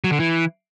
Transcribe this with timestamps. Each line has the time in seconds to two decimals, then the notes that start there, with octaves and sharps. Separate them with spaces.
0.04 F#3
0.12 D3
0.20 E3